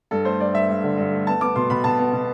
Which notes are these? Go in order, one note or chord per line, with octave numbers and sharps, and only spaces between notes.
G2 A4
A3 C5
G2 D5
G2 E5
G2
D3
G2
A3
B3 A5
B3 D6
B2 C6
B2 B5
B2 A5
B3
B2